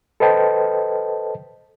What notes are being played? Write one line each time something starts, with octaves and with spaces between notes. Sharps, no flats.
A4 B4 C5 D#5 G5 A5